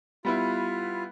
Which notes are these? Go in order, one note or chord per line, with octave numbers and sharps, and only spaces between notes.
G3 B3 E4 F4